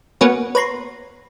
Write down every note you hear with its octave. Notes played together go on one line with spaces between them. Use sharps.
A#3 B3 C#4 F#4 B4
B4 C#5 A#5 C6